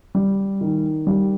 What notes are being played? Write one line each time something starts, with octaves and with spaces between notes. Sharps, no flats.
G3
D#3
G3